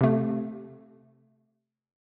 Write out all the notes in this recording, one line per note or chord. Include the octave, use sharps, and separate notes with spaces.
C3 A3